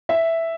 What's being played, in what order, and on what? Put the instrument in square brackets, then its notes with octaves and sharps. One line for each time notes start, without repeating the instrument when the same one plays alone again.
[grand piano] E5